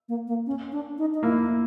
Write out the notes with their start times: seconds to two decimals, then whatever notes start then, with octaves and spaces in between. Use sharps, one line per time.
0.09 A#3
0.28 A#3
0.47 C#4
0.72 D4
0.98 D#4
1.14 D#4
1.23 A#3 E4